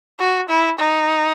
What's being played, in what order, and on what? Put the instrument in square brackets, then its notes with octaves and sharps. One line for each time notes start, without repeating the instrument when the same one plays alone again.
[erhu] F#4
E4
D#4